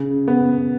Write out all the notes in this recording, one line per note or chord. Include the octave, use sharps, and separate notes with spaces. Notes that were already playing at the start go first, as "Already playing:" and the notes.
Already playing: C#3
B3